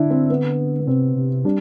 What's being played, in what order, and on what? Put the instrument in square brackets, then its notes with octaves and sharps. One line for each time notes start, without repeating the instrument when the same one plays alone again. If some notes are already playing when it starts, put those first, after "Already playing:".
Already playing: [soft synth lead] D3 [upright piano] D4 E4
[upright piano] C4
B3
B3
[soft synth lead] C3 [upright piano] C4
[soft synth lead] C3
[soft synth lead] G3 [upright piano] D4